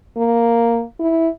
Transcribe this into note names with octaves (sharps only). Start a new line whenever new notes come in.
A#3
E4